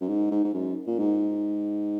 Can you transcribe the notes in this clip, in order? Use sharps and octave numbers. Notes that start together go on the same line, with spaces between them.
F#2
G#2
G#2
G#2
F#2
A#2
G#2